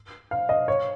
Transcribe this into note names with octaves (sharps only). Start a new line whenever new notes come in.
F5
D#5
C#5